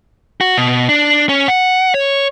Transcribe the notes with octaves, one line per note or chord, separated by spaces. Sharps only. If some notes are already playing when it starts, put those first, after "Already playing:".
F#4
B2
D4
C#4
F#5
C#5